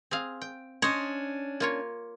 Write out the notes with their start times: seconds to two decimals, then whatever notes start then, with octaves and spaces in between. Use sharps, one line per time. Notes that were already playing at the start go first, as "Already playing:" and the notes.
0.11 C4 G#4 F5
0.42 G5
0.82 C#4 D4 C5 C#5 D#5
1.60 A#3 F4 C#5